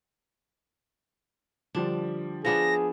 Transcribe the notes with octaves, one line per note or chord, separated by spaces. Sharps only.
D3 F3 G3 D4
F3 B3 D4 G#4 A#6